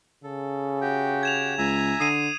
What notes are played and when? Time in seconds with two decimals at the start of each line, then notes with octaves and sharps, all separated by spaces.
0.24 C#3 A4
0.81 F#4 G4 G5
1.23 G#6 E7 F7
1.58 C#2 E5 G#5 A#5
2.00 D3 D#6 C7 D#7